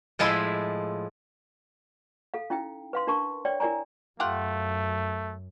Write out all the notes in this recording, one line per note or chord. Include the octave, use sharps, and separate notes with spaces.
A2 F3 G#3 E4 E5 C6
A4 F5
C#4 D#4 E4 G5
B4 F5 C6
D4 A#4 A5 C#6
C#5 D5 G5
E4 A#4 D5 G#5 A#5
F#2 A3 F4 G4 F#5